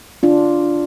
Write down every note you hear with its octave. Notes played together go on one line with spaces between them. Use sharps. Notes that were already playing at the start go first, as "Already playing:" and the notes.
D4 F4